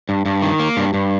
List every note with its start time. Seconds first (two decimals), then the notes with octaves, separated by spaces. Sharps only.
0.09 G2
0.26 G2
0.42 D#3
0.60 A#3
0.77 G2
0.94 G2